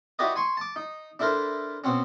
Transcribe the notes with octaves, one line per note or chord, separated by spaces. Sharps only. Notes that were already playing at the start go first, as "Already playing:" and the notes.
E4 F#4 G4 B4 D5 D#5
G#5 C6 C#6
A5 D6
D#4
D4 E4 A4 A#4 C5
B2 C4 C#4